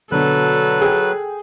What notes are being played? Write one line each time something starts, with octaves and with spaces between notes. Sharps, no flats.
B2 D3 F#3 A4 B4 F#6
G#4 G5